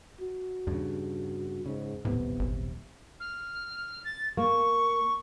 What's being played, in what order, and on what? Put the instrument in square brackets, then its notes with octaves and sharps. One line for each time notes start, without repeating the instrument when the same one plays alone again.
[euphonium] F#4
[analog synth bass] E2 [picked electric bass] G2 C#3
[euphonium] G#2 [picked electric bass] C#3
[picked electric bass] D#1 B1 C3 [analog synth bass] A2 [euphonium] B3
[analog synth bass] G#1
[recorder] F6
A6
[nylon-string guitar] A#3 [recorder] C#6